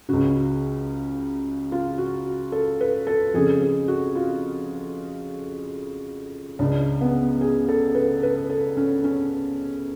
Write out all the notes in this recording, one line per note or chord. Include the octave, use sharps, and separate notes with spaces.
C#2 C#3 F#4
F4
F#4
A4
B4
A4
F2 C#3 G#4
G#4
F#4
F4
C#2 C#3 D4
B3
G#4
A4
B4
B4
A4
C#4
C#4